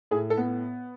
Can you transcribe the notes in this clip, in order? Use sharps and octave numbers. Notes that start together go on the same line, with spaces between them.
A2 G#4
A4
B3